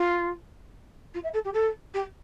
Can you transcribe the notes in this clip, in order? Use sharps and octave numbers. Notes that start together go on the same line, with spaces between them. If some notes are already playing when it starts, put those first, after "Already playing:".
Already playing: F4
F4
E5
A4
G4
A4
G4